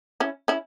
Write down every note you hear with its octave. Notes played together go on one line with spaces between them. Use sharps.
C#4 E4
C#4 E4